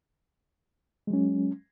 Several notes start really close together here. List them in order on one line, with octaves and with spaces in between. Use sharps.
G#3 F#3 C#4